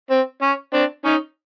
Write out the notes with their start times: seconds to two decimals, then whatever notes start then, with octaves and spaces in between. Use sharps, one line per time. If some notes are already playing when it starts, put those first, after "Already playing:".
0.11 C4
0.42 C#4
0.73 C4 D4
1.05 C#4 D#4